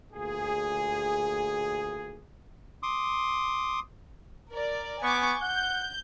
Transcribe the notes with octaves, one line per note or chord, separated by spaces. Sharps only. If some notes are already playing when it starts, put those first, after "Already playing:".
D2 A#2 G#4
C6 D6 D#6
A#4 D5
B3 G#5 C#6 D6
F#5 G6